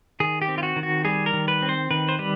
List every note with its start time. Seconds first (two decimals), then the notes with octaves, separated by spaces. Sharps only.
0.20 D#3 G#4
0.42 G4
0.48 C4
0.58 F4
0.63 F#4
0.76 D#3
0.83 F#4
1.05 G3 G#4
1.26 A#4
1.33 D#3
1.48 B4
1.62 C4
1.69 C5
1.91 D#3 B4
2.09 C5
2.19 G3 B4